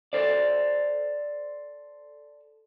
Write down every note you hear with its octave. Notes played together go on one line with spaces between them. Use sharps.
A4 C5 D5